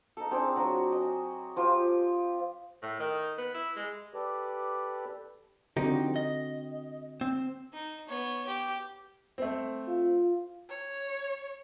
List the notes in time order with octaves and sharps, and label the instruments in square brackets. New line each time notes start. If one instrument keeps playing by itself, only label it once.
[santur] D#4 A4
C4 D4 G#4 A#5
F#3 D4 F#4
D#5
F3 F4 G4
[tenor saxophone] A2
D#3
B3
E4
G#3
[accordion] G4 A4 B4 D5
[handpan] D3 C4 F#4 [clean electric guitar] F3 D#4 G4
[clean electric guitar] D#5
C4
[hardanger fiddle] D#4
B3 C#5
G4
[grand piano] A3 C4
[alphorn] F4
[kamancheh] C#5